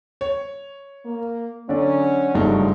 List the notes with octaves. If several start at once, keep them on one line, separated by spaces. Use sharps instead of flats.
C#5
A#3
D3 F#3 C#4 D5
F#1 G2 F3 F#3 A3 D#4